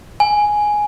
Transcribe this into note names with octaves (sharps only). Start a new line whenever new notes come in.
G#5